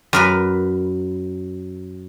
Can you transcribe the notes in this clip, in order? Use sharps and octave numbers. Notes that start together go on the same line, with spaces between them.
F#2 A#4 B4